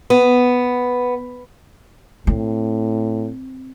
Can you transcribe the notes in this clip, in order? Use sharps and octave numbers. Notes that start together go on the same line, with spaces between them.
B3
A2 C4